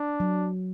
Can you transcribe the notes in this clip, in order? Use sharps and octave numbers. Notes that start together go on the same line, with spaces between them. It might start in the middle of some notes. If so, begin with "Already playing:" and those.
Already playing: D4
F#3